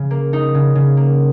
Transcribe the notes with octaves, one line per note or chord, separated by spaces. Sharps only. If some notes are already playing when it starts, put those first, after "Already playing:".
Already playing: C#3
A#3
D#4
C#3
C#3
A#3